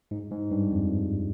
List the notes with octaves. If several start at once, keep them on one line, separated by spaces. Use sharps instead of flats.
G#2
G#2
G2
F2